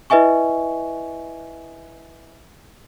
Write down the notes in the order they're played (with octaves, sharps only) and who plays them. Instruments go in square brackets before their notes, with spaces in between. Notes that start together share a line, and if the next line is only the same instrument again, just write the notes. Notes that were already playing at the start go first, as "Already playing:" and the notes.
[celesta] E4 B4 D#5 E5 G#5 C#6